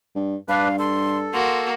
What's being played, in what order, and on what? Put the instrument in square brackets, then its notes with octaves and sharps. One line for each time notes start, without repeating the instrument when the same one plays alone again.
[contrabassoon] G2
[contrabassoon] G2 [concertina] D4 B4 [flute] F5
[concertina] A4 [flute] C6
[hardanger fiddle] A#3 F#4 [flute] C6